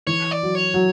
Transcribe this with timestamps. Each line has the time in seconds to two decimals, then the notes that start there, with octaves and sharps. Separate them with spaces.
0.07 E3 C#5
0.31 D5
0.43 F#3
0.55 C#5
0.74 F#3